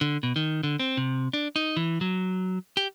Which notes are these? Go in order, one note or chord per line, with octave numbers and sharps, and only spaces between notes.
D3
B2
D#3
D3
C4
C3
D4
D#4
E3
F#3
G4